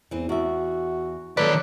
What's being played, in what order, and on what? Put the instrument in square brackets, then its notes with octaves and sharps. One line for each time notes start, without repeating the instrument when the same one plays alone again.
[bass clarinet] E2 [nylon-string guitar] E3 C4
[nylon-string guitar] E2 E5 [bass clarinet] F#4
[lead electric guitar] D#3 D5 [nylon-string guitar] F#3 A#3 A4 [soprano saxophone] B4